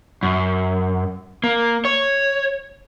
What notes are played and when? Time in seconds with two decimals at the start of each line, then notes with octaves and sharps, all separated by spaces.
0.23 F#2
1.44 A#3
1.85 C#5